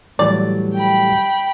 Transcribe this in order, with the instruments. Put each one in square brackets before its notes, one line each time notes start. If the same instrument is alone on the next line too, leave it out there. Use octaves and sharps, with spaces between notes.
[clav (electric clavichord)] A2 E3 F#3 [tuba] G3 [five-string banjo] D5
[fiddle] G5 B5